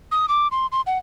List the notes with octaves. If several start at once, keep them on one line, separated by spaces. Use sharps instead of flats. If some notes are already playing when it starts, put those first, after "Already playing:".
D#6
D6
C6
C6
F#5